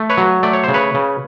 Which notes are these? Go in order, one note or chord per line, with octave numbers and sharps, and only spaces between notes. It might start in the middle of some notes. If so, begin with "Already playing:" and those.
Already playing: A3
B4 C#5
F#3
A3 D5
C#5
C#3 C5
B4 C#5
C#3